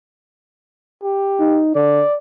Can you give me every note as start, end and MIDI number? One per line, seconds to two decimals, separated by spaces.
1.03 1.62 67
1.39 1.74 63
1.75 2.02 50
1.75 2.17 74